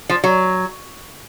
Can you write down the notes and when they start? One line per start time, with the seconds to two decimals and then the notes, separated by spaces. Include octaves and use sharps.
0.09 F3
0.24 F#3